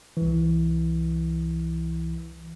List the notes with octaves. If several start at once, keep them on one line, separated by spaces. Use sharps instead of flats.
C2 E3